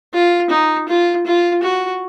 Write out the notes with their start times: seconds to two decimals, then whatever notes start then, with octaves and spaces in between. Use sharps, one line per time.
0.14 F4
0.50 D#4
0.88 F4
1.26 F4
1.63 F#4